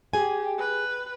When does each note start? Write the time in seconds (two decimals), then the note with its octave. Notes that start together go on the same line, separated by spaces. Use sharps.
0.13 G4 G#4 G#5
0.58 B4